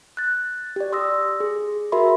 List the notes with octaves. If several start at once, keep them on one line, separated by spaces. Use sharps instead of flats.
F#6 A6
G4 D5
C6 D#6 E6 A#6
G#4
F#4 A#4 E5 B5 C6